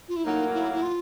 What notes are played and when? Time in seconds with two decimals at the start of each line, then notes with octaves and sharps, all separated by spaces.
0.08 F4
0.16 E4
0.24 A2 F#3 A#3 D#4
0.54 E4
0.73 E4
0.82 F4